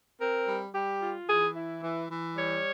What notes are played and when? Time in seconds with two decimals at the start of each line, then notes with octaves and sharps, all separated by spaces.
0.19 C4 A#4
0.47 G3
0.74 G3 G4
1.02 F4
1.28 E3 G#4
1.55 E4
1.83 E3
2.09 E3
2.37 G3 C#5